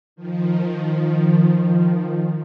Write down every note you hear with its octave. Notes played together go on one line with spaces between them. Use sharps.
D#3 F3